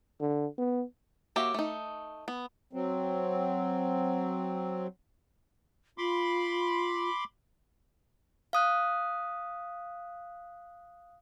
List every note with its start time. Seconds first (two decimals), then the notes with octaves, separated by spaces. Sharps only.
0.21 D3
0.58 B3
1.36 A#3 F#4 G4 C#5 E5
1.54 A3 D#4
2.28 B3
2.73 F#3 C4
5.98 F4 B5 C6 D6
8.53 F5 D#6 F#6